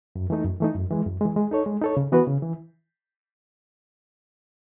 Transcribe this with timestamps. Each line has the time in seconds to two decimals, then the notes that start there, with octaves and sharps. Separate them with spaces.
0.16 F#2
0.30 E3 A3 D#4
0.45 F#2
0.60 E3 A3 D#4
0.75 F#2
0.90 E3 G#3
1.06 F#2
1.21 E3 G#3
1.36 G#3
1.51 D#4 A4 C#5
1.66 G#3
1.81 D#4 A4 C#5
1.97 C#3
2.12 E3 B3 F#4 B4
2.27 C#3
2.42 E3